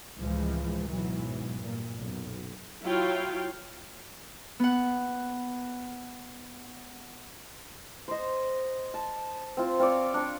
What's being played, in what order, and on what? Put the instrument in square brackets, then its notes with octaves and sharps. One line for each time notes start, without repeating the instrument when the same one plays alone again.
[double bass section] C#2 A2 E3 F3 G#3
G#2 B2 E3 F#3
G2 A#2
B1 F#2
[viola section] F#3 E4 F4 C#5 F5 G5
[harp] B3 F#5
[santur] C5 D#5
A5
C4 F4
C4 F4 C#5 D5
D4 C#6